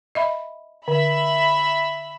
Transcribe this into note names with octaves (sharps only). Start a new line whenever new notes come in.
D#5 E5 B5
D3 E5 B5